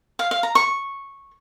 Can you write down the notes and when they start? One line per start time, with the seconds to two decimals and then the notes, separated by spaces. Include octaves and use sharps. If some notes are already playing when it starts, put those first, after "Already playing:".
0.19 F5
0.31 F5
0.43 A#5
0.55 C#6